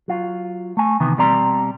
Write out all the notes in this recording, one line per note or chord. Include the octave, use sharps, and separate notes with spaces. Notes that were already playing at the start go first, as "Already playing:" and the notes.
F#3 F4
A3 G#5
C3 D#3 E3 B3
B2 G3 C4 D5 A#5 C6